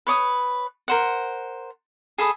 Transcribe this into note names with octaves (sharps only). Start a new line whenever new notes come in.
B4 C#5 D6 D#6
A#4 C5 F#5
G#4 A4 B5 D#6